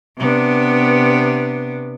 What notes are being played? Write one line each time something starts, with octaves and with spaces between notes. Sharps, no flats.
C3 B3 D4